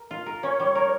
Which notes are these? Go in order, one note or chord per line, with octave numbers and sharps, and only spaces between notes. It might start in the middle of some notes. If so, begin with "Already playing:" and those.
Already playing: A#4
F4
A#4
C#4 C#5
G3
A#4